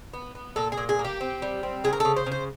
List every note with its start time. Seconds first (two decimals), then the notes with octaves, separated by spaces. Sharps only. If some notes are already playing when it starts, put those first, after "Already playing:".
0.13 B3
0.35 B3
0.56 A#2 A4
0.72 G#4
0.77 A#2
0.89 G#4
0.99 A#3
1.05 G4
1.21 C4
1.42 G3
1.63 C4
1.84 C#3 G#4
1.93 A#4
2.00 C#3 A4
2.16 C5
2.26 C#3
2.32 C5